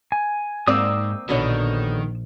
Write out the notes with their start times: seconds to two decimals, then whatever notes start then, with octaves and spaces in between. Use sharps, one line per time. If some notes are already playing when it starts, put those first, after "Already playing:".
0.12 G#5
0.67 G#2 A#3 C4 D5 D#6 E6
1.29 A#1 B2 D3 D#3 C#5